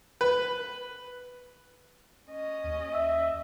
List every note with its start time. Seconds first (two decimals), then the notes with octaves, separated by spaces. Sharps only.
0.21 B4
2.29 C#4 D#5
2.64 D#2
2.94 E5